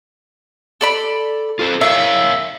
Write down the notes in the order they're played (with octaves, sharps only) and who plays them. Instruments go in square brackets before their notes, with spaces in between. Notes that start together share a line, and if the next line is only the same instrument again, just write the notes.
[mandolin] A4 D5 B5
[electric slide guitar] F4 A4 C5
[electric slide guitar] A#4 C#5 F5 [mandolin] E5